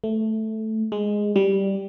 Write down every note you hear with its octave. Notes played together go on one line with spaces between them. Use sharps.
A3
G#3
G3